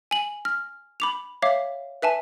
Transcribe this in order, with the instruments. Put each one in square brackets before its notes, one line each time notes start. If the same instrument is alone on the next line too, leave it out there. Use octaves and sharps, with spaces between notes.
[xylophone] G#5 F#7
F6
B5 D6 F7
C#5 E5 F5 D6
B4 E5 G#5 A5